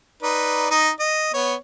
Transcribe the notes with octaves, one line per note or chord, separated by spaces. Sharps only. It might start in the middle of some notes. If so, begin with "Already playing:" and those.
D#4 B4 D5
D#4 D#5
D#5
B3 C#5